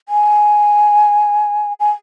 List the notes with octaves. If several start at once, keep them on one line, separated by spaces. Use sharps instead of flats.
G#5
G#5